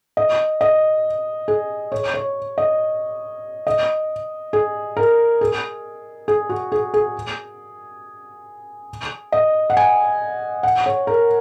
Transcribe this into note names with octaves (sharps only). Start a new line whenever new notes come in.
D#5
D#5
G#4
C#5
C#5
D#5
D#5
G#4
A#4
G#4
G#4
F#4
G#4
G#4
D#5
F#5
G#5
F#5
C#5
A#4